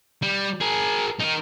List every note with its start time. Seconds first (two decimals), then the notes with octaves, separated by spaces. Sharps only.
0.23 G3
0.61 G#4 A#4
1.20 D#4 A#4